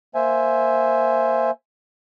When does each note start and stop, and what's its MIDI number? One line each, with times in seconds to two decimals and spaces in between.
0.15 1.51 58
0.15 1.51 72
0.15 1.51 76
0.15 1.51 80